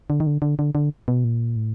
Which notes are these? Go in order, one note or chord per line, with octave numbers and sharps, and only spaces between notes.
D3
D#3
D3
D3
D3
D3
B2
A#2
A2